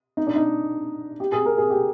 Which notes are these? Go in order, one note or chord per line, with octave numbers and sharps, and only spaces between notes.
D#4
D4
D#4
G4
G#4
A#4
G#4
G4